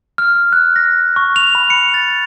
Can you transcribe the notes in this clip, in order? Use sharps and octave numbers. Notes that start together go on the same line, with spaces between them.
F6
F#6
A#6
C#6
F7
B5
C#7
A6